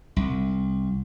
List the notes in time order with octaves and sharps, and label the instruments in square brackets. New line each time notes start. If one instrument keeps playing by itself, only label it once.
[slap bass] C2